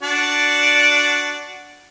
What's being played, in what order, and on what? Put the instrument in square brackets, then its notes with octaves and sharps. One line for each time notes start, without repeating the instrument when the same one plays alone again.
[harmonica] D4 F#4 D5